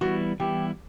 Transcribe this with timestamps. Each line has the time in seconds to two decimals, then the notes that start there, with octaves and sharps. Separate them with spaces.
0.01 E3 G3 B3 E4 F#4
0.40 E3 G3 B3 E4 G4